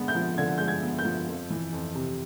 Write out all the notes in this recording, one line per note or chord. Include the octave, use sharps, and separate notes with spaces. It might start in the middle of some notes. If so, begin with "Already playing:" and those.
Already playing: D3 G#3 B3
G6
F3
D3 G#6
G#3 G6
G#6
B3
G6
F3
F2
E3
F2
C3